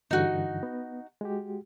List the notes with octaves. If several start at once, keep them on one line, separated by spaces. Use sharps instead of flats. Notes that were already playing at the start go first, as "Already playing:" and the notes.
G2 D3 E3 D#4 F#4
B3
G#3 F#4 G4